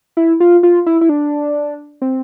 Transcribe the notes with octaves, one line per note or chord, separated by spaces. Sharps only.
E4
F4
F4
E4
E4
D4
C4